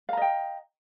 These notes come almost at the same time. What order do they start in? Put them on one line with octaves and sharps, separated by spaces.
F5 A#5 D#5 G5